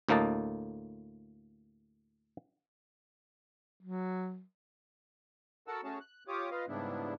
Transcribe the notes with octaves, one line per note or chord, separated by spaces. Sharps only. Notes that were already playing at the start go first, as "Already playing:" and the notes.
D2 A2 A#3 D#5 A5
F#3
F#4 A4 A#4 F#5 A5 E6
A3 C#4 F#4 G#4 C#5 A5
F#6
F4 G4 C#5 D6 D#6
F4 B4 D#5 F5
G#2 C#3 G3 B3 D4 E4